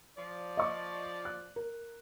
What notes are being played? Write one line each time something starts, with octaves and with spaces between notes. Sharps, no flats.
F3 D5
D#5 C#6 D6
F#6
A#4